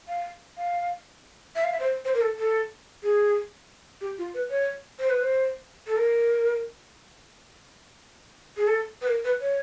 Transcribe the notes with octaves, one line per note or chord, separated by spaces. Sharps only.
F5
F5
E5
F5
E5
C5
C5
A#4
A4
A4
G#4
G4
F4
B4
C#5
C5
B4
C5
A4
A#4
G#4
A4
B4
A#4
B4
C#5